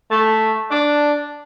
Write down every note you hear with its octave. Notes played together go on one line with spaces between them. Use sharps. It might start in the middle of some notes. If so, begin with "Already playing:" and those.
A3
D4